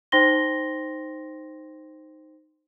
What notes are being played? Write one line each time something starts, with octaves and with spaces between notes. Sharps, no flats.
D#4 C5 G5 C6 A#6 G7